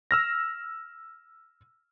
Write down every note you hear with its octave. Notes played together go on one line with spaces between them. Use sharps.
E6 F6 A#6